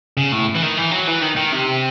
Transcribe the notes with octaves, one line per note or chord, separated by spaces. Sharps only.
C#3
A2
E3
D#3
E3
F#3
E3
D#3
D#3
C3